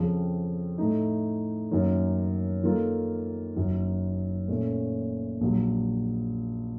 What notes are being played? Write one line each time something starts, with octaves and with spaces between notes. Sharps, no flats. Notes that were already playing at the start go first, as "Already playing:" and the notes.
Already playing: F2 C#3 F3 C4
A2 A3 D#4
F#2 D#3 A#3 C#4
D#3 A#3 F4 A4
F#1 F#2 D#3
A#2 A3 C#4
A#1 A#2 F#3